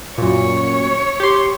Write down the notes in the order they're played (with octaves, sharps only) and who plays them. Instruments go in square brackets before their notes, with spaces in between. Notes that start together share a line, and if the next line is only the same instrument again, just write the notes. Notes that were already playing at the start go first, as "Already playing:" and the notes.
[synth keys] F#2 A#2 [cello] C#5
[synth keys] G4 C6